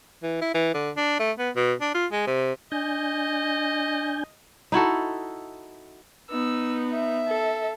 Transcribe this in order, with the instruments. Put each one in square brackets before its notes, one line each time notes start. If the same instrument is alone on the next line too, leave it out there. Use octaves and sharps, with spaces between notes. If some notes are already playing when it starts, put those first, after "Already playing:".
[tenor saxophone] E3
E4
E3
D3
D4
A3
B3
B2
D4
F4
G#3
C3
[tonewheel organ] D4 G#5 G6 [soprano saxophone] D#5
[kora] D#4 E4 F#4 A4
[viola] B3 D#4 [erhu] E6
[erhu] E5
[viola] A4